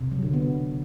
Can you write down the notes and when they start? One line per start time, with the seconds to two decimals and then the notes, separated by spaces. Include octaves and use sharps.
0.01 C3
0.12 F#3
0.23 D3
0.34 B3